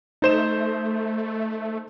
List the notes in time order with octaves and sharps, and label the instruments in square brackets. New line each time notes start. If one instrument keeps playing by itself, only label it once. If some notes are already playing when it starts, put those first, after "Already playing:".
[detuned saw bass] A3 [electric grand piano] D#4 C5 E7